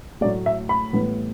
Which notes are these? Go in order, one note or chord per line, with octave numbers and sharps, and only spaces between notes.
A2 F#3 A3 D5
E5
B5
A2 E3 G3 B3